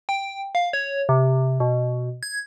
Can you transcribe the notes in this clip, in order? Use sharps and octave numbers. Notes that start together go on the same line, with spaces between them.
G5
F5
C#5
C3
B2
G#6